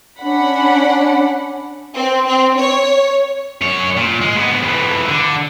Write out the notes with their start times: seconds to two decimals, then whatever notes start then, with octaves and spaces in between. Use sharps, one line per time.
0.19 C#4 D4 F#5 B5
1.94 C4
2.25 C4
2.57 C#5
3.62 F#2 C#5
3.97 A#2
4.22 G#3
4.36 G#2 B3
4.63 F2 E3
5.08 D3